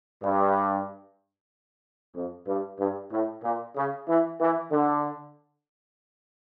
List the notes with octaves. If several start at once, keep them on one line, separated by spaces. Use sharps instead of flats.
G2
F2
G2
G2
A2
A#2
C#3
E3
E3
D3